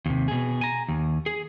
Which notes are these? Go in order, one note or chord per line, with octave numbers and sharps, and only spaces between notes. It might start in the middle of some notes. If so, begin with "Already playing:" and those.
D#2 C3
B2 G#4
G#5 A#5
D#2
G#4